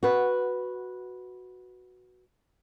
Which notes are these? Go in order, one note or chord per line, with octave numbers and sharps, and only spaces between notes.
F#4 B4